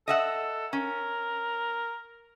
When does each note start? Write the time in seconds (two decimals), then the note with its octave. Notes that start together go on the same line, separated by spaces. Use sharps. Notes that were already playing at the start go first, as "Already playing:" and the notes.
0.08 A4 D#5 E5 F#5
0.73 C#4 A#4